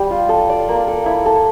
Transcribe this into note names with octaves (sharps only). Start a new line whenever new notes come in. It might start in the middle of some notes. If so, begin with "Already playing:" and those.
Already playing: G3
F4
A4
D5
A#3
A4
E4
A4